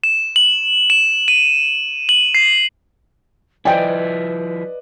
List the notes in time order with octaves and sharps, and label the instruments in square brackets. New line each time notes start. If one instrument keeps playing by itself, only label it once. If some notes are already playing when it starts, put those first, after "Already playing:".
[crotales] E7
F#7
E7
D#7
F#7
C7
[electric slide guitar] F3 E4 [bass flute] B4 [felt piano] D5 D#5 [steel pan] G5 G#5